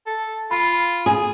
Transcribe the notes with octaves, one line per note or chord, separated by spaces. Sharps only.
A4
F4 B5
G#4